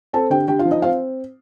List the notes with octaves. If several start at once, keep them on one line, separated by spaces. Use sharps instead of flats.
C4 A4 A5
D3 G4 G5
D3 G4 G5
F4 F5
F3
D#4 D#5
C4 F4 F5